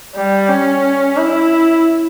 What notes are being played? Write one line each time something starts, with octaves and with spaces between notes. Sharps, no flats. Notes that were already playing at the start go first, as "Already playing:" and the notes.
G3
C#4
E4